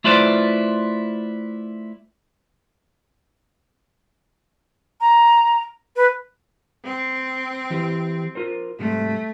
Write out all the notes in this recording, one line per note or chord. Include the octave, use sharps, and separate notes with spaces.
A3 E4 F4 B4 C5 D5
A#5
B4
C4
E3 G4
F4 A#4 C5
G#2 C3 G3 A3